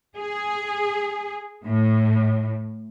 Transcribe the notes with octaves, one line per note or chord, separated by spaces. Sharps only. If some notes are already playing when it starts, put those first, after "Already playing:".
G#4
A2